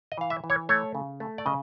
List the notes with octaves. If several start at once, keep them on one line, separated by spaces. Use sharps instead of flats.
D#5
E3 F5
E5
E3
C#5
A3 C#5
C#3
A3
D5
C#3 D#5